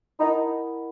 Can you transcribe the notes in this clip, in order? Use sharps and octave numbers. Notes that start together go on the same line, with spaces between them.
D#4 E4 A#4 D#5 F#5 B5